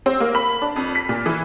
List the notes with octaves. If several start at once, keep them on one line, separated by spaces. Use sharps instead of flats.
C4
A#3
B5
D4
F2
B6
A#2
E3